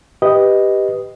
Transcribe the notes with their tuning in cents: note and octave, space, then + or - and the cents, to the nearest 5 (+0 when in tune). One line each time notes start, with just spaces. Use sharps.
G4 +0 B4 +0 D#5 +0